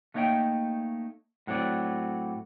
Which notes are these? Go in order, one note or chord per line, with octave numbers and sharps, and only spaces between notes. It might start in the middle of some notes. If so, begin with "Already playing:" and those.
A3 A#3 D#4 C#5 E5 G5
A2 F#3 A3 C4 D5